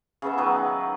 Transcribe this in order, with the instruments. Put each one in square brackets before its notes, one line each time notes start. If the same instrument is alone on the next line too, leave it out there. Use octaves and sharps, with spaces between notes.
[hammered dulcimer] C#3 B3 E5
D#3 F#3 D#4 B4